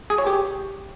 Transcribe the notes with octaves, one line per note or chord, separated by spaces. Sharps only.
G#4
C#5
G4